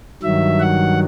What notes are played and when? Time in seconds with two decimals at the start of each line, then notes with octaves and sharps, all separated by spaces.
0.23 G2 D#3 F#3 E5
0.60 F#5